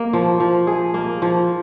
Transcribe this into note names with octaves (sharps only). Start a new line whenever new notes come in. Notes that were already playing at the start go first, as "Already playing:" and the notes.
Already playing: A#3
F3
F3
G#4
A#3
F3